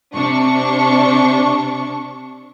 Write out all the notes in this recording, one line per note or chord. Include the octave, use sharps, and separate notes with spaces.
C3 D4 C#6